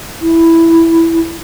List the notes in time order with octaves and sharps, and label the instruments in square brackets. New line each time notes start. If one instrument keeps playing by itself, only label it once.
[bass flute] E4